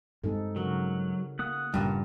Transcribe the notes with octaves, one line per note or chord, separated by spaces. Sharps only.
G2 G#3 C4 D#4 A4
C#3 F#3 F#4 A#4
A#3 F#5 D#6 F#6
G1 D2 G2 A#2 C#3